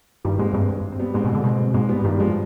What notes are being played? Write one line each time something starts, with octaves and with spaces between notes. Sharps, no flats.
G2 D#3 G3
G#2 G#3 C4
G2 G#3 C4
C4
G3 B3
G#2 G#3 C4
B2
G#3 C4
D3
B2 G#3 C4
G#2 G#3 C4
G3 B3
G2 D#3 G3
F3 G#3